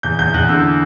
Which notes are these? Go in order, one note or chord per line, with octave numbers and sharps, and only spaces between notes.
E2 G6
E2 G6
E2 F#6
D3 E6